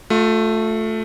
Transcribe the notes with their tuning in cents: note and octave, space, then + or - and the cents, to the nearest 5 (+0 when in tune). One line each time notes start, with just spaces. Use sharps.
A3 +0 F4 +35